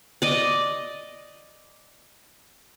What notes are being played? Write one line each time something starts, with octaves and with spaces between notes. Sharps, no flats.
D5 D#5